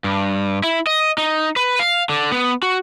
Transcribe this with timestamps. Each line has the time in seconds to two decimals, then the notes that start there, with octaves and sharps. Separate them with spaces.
0.04 G2
0.64 E4
0.87 D#5
1.18 D#4
1.56 B4
1.79 F5
2.09 D3
2.32 B3
2.62 F#4